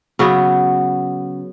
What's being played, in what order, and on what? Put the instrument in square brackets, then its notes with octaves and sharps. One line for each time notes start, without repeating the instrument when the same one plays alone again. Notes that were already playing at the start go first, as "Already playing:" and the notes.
[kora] C#3 F#3 B3